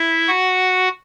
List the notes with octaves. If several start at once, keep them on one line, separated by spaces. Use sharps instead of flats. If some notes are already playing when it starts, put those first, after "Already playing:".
Already playing: E4 E5
F#4 F#5